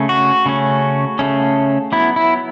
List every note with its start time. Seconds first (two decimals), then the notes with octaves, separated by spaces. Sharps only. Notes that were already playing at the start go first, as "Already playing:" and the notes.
Already playing: C#3 A3 C#4
0.09 F#4
0.46 C#3 A3 C#4
1.19 C#3 A3 C#4
1.92 F#3 B3 E4
2.16 E4